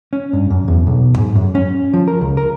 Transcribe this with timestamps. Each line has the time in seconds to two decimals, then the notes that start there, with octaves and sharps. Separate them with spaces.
0.13 C#4
0.33 G2
0.50 F#2
0.68 E2
0.87 B1
1.18 G#2
1.35 F#2
1.55 C#4
1.94 F3
2.08 A#4
2.21 C#2
2.37 A#4